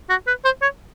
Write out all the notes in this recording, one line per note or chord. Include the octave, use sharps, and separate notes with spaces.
F#4
B4
C5
C#5